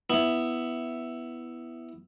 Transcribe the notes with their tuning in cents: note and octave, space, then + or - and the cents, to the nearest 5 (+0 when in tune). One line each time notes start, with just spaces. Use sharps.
B3 +0 E4 +0